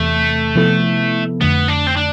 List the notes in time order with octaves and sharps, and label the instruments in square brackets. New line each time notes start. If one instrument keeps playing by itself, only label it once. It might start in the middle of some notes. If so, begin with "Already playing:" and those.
Already playing: [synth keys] E2 C3 E3 [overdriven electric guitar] A3
[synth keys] C3 F3 B3 E4 A4
[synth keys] F2 D3 A3 [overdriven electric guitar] B3
[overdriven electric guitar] D4
C4
D4